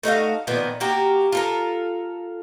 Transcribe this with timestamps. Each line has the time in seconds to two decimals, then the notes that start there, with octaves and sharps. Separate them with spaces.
0.03 A3 D#4 F#4 F5
0.47 A#2 D#3 F3 B3
0.80 A#3 F#4 G4 A#4
1.33 F4 A4 A#4